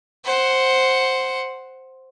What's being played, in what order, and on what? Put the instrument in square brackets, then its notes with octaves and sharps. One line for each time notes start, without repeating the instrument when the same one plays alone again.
[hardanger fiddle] C5 F#5